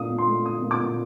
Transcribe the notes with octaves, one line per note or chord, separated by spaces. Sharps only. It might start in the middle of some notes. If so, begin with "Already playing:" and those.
Already playing: A#2 A3 D4 F5 D#6
A#2
C6
A3
D4 D#6
A#2
D6
A#2